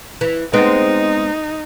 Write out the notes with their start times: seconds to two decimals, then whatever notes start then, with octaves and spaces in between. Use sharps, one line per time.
0.21 E3
0.53 G#3 B3 C4 D#4